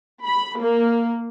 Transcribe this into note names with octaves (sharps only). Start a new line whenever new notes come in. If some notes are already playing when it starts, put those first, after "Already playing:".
B5
A#3